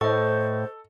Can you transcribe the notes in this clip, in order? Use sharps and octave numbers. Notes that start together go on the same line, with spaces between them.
A2 A4 C5 D#5 C#6